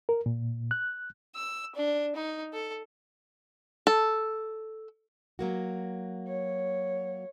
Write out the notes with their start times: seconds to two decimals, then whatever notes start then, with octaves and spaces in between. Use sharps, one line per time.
0.09 A#4
0.26 A#2
0.71 F#6
1.36 E6
1.75 D4
2.16 D#4
2.54 A4
3.87 A4
5.39 F#3 A#3 F#4
6.28 C#5